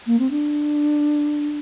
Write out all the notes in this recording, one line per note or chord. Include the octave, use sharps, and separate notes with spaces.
A#3
C4
D4